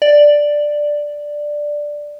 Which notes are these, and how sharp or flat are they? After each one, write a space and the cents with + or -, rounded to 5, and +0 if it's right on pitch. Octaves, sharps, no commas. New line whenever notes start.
D5 +5